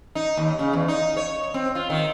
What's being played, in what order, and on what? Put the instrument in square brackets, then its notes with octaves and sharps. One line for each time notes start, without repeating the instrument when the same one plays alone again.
[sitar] D#4
D#2
C#3
E2
D#4
C#5
C4
F4
D#3